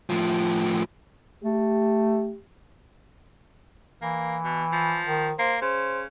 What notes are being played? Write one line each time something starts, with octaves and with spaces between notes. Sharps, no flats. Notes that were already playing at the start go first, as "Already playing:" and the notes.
A2 F3
A3 G4
E3 A#3
B2
F3
D#3
A#3 C5
C#3 C5